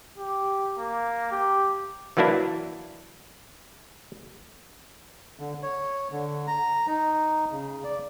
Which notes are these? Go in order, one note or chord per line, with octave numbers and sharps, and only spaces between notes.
G4
A#3
G4
E3 F#3 A#3 D4 E4
D3
C#5
D3
A#5
D#4
C#3
D5